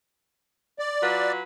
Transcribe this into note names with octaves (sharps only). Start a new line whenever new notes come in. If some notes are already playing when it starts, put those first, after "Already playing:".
D5
F#3 F4 B4